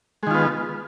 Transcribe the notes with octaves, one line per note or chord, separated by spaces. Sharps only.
D#3 G#3 B3 F4